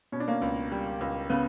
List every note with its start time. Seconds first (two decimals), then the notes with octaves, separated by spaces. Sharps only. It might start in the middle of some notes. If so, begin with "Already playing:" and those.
0.12 B2 C#4
0.20 D4
0.28 A#3 C#4
0.42 C#2
0.71 G3
1.01 C#2
1.30 C#3 B3